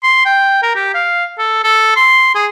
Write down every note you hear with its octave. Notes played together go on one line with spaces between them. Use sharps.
C6
G5
A#4
G4
F5
A4
A4
C6
G#4